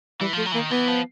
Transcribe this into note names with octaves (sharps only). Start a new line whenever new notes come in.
E3 G3
F3 A3
F#3
E3
A#3
D#3
E3 B3
F3